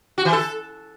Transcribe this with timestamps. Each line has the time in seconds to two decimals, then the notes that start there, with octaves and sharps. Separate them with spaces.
0.18 F#4
0.25 E3
0.33 A4